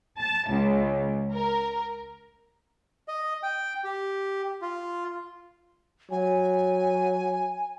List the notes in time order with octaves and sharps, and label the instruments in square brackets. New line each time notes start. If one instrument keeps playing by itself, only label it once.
[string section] A5
C#2
A#4
[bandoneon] D#5
G5
G4
F4
[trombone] F#3 [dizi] G#5